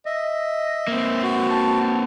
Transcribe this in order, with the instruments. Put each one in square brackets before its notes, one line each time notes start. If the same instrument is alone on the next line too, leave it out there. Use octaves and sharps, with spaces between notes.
[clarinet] D#5 [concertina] E5
[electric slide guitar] A#3 C4
[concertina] F#4
[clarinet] A5